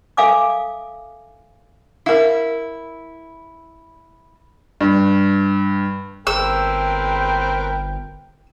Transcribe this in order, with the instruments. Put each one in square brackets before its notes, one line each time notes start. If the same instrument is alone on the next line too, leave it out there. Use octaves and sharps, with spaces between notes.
[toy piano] A4 E5 F5 G#5 D6 D#6
[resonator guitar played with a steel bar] E4 [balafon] A#4 F5
[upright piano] G2
[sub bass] G1 [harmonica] C4 A#4 B4 [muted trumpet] G5 [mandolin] E6